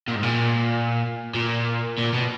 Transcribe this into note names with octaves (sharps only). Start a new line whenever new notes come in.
A#2
G#2
A#2
A#2
A#2
B2